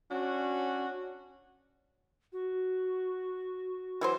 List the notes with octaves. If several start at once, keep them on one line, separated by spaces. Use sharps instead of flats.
C#4 D4 F#4
F#4
E3 F#3 C5